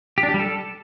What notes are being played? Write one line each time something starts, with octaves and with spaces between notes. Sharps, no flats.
G4
D4
G4
G3
A4